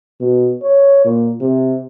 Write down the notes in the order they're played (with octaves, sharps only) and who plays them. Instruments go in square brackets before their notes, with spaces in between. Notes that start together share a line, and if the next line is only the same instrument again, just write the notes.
[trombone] B2
C#5
A#2
C3